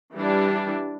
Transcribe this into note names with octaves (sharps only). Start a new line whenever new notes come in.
E3 G3 D4